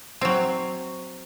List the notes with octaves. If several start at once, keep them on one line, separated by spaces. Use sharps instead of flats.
F#3 C4